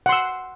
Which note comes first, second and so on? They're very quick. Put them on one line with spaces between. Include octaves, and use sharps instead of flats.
F#5 C6 E6